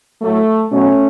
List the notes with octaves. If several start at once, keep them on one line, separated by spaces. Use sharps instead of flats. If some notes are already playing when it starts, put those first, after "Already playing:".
A2 F#3 A3
B2 F#3 A3 C#4